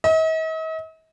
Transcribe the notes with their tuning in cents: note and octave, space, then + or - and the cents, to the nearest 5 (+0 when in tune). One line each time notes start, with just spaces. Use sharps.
D#5 +45